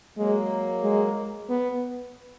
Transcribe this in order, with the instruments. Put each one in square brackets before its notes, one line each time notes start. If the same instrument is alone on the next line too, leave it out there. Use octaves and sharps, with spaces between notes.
[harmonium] F#3 A#3 [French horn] G#3
[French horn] G#3
B3